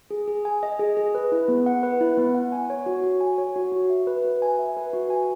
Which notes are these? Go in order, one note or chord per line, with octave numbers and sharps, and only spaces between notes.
G#4
G#4
G#5
D#5
G#4
G#4
B4
E4
B3
F#5
B4
E4
B3
F#5
G#5
C#5
F#4
F#4
G#5
C#5
F#4
F#4
E5
B4
F#4
G#5
E5
B4
F#4
G#5